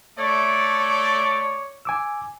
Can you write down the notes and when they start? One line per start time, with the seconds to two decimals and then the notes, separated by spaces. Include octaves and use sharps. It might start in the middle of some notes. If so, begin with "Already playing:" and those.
0.19 A3 C#5 D5
1.85 G#5 D6 E6